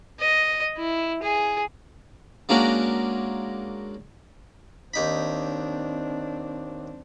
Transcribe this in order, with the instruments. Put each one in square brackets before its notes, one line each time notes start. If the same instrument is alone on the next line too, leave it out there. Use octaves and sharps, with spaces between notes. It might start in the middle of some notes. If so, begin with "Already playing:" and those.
[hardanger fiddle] D#5
E4
G#4
[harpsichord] G#3 A#3 C#4 D4 F#4 A#4
[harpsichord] D#2 D#4 B5 [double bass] C4 D4